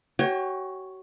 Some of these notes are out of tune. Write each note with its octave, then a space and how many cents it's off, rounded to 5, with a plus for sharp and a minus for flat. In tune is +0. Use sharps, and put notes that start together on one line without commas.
F#4 +40 C#5 +0 G5 +40